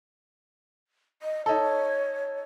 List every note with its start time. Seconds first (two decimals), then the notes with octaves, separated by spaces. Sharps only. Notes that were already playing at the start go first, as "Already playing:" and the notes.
1.22 D#5
1.46 D#4 A4 C#5